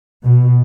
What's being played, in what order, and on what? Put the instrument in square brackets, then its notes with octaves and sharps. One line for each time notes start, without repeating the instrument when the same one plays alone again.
[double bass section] B2